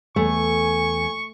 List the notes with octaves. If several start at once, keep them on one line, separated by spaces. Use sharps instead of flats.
E2 A3 G#5 C#6